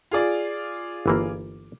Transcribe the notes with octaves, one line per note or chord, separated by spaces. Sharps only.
F4 G#4 D5
G1 E3 A#3